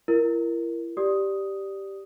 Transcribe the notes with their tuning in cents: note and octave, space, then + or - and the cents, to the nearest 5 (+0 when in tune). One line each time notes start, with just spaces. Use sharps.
E4 +40 A#4 +0
G4 -5 D5 +0 D#6 +5